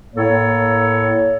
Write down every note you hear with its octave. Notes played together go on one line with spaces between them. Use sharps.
A2 A#3 A4 C#5